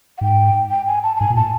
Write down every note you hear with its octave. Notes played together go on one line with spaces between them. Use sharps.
F#5
G#2 G5
G5
G#5
A5
A5
G#2 G#5
A#2
A2 A5